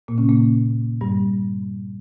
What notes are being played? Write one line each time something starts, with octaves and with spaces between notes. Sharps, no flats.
A#2 A#3
C#3 C#4
A#2 A#3
G2 G3